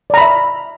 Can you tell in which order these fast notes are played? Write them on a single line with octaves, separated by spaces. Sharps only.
D5 A#5 B5 E5